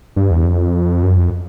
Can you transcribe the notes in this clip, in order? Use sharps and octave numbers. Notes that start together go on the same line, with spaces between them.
G2
E2
F2
F#2
F2